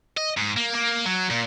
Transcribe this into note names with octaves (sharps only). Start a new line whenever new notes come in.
D#5
G#2
A#3
A#3
F#3
A#2